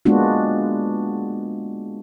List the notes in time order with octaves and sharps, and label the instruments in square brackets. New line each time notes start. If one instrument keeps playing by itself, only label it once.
[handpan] G#3 A#3 B3 D4 F4 F#4